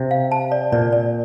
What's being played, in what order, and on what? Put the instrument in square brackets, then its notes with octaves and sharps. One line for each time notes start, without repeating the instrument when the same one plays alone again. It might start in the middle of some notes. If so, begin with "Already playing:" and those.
Already playing: [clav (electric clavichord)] C3
[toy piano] F5
A5
D5
[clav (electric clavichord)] A#2 [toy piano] D5
[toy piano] D5